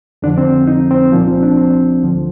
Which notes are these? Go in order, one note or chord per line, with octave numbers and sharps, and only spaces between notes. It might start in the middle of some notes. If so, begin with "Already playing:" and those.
F2 D3 F3 D4
C4
D#4
C4
C2 A#2 F3 A#3
C4
D4
C4
D2 D3 F3